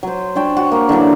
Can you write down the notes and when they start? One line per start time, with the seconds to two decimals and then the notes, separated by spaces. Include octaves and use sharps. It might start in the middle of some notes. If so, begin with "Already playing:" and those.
0.03 F#3 C5
0.35 D4 C#5 G5 A5
0.57 F#4
0.72 A#3
0.89 D3 E3 F#3 D4